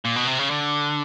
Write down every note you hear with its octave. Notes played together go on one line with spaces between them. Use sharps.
A#2
B2
C3
C#3
D3